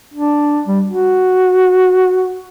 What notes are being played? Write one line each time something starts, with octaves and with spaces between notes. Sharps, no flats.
D4
G3
F#4